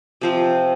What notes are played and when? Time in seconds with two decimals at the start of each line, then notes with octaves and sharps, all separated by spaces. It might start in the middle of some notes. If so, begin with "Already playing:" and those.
0.21 C3 F3 C4